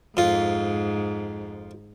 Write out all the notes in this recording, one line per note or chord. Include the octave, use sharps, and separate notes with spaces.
F2 G#2 F4